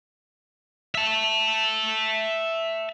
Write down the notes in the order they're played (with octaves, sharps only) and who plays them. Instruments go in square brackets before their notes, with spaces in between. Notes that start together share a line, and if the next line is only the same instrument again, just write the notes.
[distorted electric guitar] E5 A5